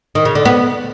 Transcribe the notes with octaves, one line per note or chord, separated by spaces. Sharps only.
D#3
C#3
D3
B3